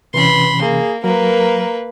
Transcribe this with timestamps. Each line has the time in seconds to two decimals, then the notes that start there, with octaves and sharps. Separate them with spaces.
0.14 C3 E3 C#4 B4 B5 C6
0.62 A#3 G#4
1.04 F#3 A#3 A#4 B4